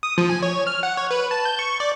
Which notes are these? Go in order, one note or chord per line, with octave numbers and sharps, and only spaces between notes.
D#6
F3
G#5
C#5
F6
F#5
C#5
B4
A5
G6
C#6
D5